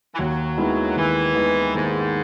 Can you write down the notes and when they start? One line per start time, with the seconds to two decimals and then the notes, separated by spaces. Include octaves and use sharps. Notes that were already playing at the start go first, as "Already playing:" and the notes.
0.13 E3
0.18 D#2 F#3
0.57 D#3 G#3 B3 E4
0.96 D#2 E3
1.35 D#3 G#3 B3 E4
1.74 D#2 G#2